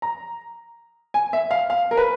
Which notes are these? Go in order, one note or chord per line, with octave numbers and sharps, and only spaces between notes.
A#5
G#5
E5
F5
F5
A#4
B4